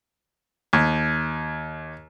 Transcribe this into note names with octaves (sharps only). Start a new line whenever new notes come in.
D#2